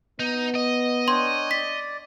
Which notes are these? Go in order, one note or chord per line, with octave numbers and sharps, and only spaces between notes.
B3 D#4
D#5
D4 C#5 G5 C6
D5 B6